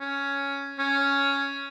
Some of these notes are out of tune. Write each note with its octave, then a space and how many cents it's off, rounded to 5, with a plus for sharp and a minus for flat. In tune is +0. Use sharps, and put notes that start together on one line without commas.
C#4 +5
C#4 +5